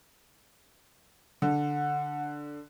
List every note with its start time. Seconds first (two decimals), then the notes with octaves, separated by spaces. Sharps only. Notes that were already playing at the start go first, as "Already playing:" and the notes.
1.42 D3 F#5